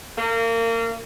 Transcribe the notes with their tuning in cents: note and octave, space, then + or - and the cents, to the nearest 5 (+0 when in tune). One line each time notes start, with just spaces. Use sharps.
A#3 -30